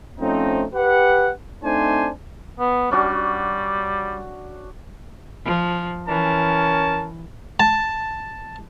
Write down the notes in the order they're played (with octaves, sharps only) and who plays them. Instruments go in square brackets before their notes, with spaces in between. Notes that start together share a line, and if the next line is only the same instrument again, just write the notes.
[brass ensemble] F3 A3 C4 C#4 D#4
G4 B4 F#5
A3 C4 D4 D#4 C5 G#5
[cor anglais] B3
[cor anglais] G3 [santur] C#4 D4 F#4
[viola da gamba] F3
[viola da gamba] E3 [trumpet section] C#4 A#4 A5
[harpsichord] A5